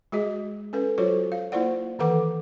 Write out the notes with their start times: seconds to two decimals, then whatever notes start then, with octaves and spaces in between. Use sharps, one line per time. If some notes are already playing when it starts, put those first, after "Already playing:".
0.12 G#3 F#4 G#4 D#5
0.73 C#4 A4 B4
0.98 F#3 F4 F#4 A4 C5 C#5
1.32 F5
1.52 A#3 E4 F4 C5 D5 F#5
1.99 D#3 E3 A4 B4 F#5 D6